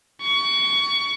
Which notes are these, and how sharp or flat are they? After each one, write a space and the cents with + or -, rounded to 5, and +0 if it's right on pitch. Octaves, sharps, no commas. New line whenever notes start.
C#6 +25